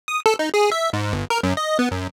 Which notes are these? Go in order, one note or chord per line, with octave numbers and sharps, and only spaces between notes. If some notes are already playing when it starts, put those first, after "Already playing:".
D#6
A4
D#4
G#4
E5
G#2
G1
A#4
F#2
D#5
B3
F#2